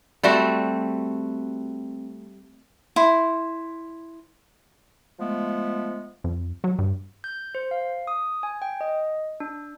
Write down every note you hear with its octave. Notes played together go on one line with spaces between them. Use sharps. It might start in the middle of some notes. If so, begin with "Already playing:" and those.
G3 A3 C4 F#4
E4 C5
F3 G#3 A3 B3
F2
F#3
G2
G6
C5
F5
D#6
G#5
G5
D#5
D4